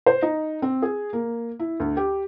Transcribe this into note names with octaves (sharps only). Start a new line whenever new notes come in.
C5
D#4
C4
G#4
A#3
E4
D2
G4